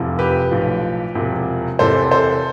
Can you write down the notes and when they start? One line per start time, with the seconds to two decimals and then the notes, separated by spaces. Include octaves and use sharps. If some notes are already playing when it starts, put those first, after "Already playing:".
Already playing: F1 E2 C3 F3
0.19 G4 B4
0.51 B1 A2 F3
1.15 E1 E2 C3 F3
1.79 E2 C3 E3 A4 C5
2.11 A4 C5